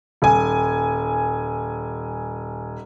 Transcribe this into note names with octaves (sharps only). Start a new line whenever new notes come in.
D#1 G#5